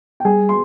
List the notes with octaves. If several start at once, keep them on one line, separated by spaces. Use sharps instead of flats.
G5
G3 G#4 G#5
C6